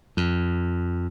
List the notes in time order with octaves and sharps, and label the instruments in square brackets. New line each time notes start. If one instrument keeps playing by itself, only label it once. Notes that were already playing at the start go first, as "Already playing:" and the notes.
[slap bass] F2